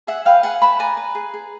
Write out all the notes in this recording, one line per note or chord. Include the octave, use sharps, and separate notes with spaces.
G#4 E5 F#5
B4 F5 G5
G#4 F#5 G#5
B4 A5 B5
D5 G#5 A#5
B4
G#4
G#4